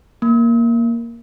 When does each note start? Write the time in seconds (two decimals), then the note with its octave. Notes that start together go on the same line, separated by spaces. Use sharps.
0.22 A#3